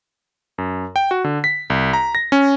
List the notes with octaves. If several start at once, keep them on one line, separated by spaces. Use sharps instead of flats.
F#2
G5
F#4
D3
B6
C2
A#5
A#6
C#4